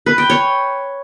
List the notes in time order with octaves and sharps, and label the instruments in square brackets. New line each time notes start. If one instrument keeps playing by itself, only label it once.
[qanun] B4
G5
C#5